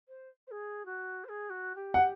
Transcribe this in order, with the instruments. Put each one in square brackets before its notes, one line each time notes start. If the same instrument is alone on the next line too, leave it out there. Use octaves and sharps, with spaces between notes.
[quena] C5
C5
G#4
F#4
C5
G#4
F#4
G4
[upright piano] F#5